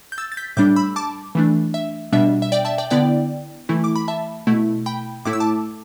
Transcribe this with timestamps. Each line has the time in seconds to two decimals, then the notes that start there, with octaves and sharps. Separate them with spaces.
0.12 G6
0.18 E6 A6
0.32 A6
0.37 G6 B6
0.57 A2 G3 D4 D6 G6
0.76 B5 E6
0.96 A5 D6
1.35 E3 A3 D4
1.74 E5
2.13 B2 G3 D4 E5
2.42 E5
2.52 D5 G5
2.65 E5 A5
2.78 D5 G5
2.90 D3 B3 E4 D5 G5
3.69 E3 A3 E4
3.84 D6
3.96 B5
4.08 E5 A5
4.47 B2 A3 E4
4.86 G5 B5
5.25 A2 A3 E4 D6
5.33 E6
5.40 A5 D6